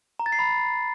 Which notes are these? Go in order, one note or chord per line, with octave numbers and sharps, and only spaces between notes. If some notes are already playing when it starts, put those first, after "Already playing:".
A#5
A6
C7
B5